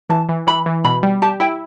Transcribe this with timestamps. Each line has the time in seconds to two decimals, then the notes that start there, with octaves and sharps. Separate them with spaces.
0.09 E3 A5
0.29 E3
0.47 E3 B5
0.66 E3
0.85 B2 B5
1.03 G3
1.22 G4 A5
1.40 E4 G5